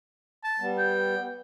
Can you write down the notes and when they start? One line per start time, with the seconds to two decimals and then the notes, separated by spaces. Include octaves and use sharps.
0.44 A5
0.60 G3 B3
0.78 G5